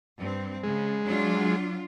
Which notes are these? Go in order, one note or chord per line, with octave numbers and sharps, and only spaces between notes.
G2 C4
C#3 G#3
F#3 D4 F4